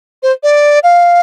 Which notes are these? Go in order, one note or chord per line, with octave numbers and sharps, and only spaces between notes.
C5
D5
F5